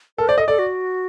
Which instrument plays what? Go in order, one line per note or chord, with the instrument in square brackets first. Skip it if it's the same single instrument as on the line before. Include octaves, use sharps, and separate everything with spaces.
[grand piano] A4 [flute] A#4
[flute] C5 [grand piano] D5
[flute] A4 [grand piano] D#5
[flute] A4 [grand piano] D5
[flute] F#4